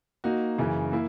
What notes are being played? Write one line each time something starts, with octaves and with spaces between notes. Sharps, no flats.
A#3 D#4 F#4
F#2 C#3 E3
A#3 E4